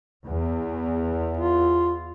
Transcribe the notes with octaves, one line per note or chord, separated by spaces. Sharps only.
E2
F4